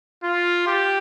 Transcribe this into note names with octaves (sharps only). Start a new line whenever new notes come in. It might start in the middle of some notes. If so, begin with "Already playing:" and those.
F4
G4